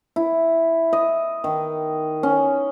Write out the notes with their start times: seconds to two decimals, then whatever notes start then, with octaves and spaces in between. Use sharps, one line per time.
0.16 E4
0.93 D#5
1.44 D#3
2.23 C#4